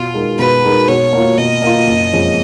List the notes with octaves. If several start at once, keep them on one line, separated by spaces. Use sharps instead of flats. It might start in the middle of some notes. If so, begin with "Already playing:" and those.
Already playing: B2 F4
G#3 D#4 A#4
B2 B4
G#3 D#4 A#4
B2 C#5
A#3 F4
B2 D#5
A#3 F4
F#1
F2 F3 G#3 C#4